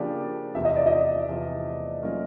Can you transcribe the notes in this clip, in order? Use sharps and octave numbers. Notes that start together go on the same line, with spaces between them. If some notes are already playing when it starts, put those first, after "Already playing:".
Already playing: C#3 F3 A#3 D4 G4 D5
E2 C3 F3 E5
D#5
D5
D#5
E2 C3 F3
F#3 A#3 C#4 F4 A#4